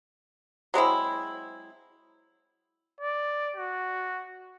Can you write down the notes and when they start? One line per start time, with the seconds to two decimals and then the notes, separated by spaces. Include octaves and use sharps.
0.74 F#3 G#3 C4 E4
3.01 D5
3.56 F#4